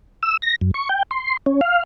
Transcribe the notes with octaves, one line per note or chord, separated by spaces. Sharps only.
E6
A#6
F#2
C#6
G5
C6
C#4
F5